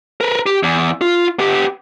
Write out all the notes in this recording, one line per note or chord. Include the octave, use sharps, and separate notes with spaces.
A#4 B4
G4
E2
F4
B3 G4